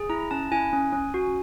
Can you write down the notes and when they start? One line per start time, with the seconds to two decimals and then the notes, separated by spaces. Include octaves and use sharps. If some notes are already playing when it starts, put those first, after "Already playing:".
Already playing: G#4
0.09 E4 A#5
0.31 C#4 A5
0.52 E4 G#5
0.73 C#4
0.93 C#4
1.14 F#4